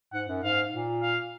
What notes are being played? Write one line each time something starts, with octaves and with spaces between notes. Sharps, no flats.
G#2 F#5
F#2
G#2 F5
A#2
F5